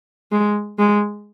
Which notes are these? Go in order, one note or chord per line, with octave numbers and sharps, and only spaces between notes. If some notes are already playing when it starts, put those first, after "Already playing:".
G#3
G#3